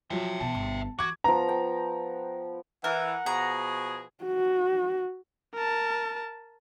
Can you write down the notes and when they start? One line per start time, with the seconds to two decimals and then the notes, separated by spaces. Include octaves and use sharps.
0.10 F3 F#3 E5 G5
0.40 B2 E3 A5
0.55 G1
0.99 E3 F#4 D6 G#6
1.24 F3 B3 A#5
1.49 G5 A5
2.84 E3 A#4 F#5
3.26 B2 F3 G#4 A#5
4.24 F#4
5.54 A#4 A5